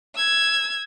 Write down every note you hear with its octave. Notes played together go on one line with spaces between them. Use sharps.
E6 G#6